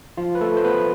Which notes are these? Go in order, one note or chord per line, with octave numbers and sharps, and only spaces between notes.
F3 F4
B4
A3 A4
C5
B3 B4